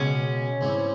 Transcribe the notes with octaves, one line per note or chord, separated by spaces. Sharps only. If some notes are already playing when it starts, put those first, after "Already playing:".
Already playing: C#2 B2 G#3 C#4
G#2 E3 G3 C4